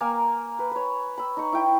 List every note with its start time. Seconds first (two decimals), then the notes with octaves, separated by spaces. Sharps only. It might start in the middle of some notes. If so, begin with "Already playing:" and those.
0.01 A#3 A#4 G#5
0.59 B4
0.71 B4 C#5
1.18 B5 E6
1.37 D#4 C#6
1.52 E4 G5